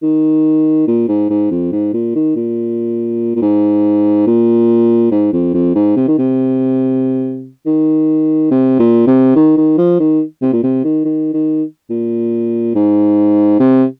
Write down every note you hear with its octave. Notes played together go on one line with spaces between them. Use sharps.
D#3
A#2
G#2
G#2
F2
G#2
A#2
D#3
A#2
A#2
G#2
A#2
G#2
F2
F2
G#2
C3
D#3
C3
D#3
C3
A#2
C3
D#3
D#3
F3
D#3
C3
A#2
C3
D#3
D#3
D#3
A#2
G#2
C3